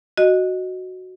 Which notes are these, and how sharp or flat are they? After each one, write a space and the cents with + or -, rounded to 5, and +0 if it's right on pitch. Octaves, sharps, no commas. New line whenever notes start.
F#4 +0 D#5 -5